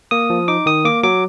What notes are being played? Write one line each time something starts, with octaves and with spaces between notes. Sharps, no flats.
A#3 D#6
F3
D#4 D6
D#3 D#6
A#3 D6
F#3 D6